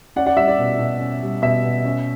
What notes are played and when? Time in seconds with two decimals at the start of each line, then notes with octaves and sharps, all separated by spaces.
0.16 C#4 D5 F#5
0.26 D5 F#5
0.36 G3 E5
0.48 D5
0.58 B2
0.79 B2
1.00 C#4
1.21 G3
1.42 B2 E5
1.64 B2
1.85 C#4